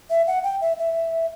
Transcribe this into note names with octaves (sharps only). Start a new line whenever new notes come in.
E5
F#5
G5
E5
E5